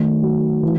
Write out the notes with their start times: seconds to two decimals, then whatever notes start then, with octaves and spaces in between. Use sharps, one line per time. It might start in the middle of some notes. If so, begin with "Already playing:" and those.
Already playing: D#3 F#3 A3
0.22 F#3
0.63 E3